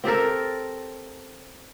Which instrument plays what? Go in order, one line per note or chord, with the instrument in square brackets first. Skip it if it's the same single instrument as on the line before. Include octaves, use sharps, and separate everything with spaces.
[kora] C4 G4 A4 A#4